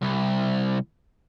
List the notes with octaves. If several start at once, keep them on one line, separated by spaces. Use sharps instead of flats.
C2